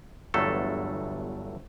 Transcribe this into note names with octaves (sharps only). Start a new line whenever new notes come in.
G1 E2 G2 F#3 A3 A4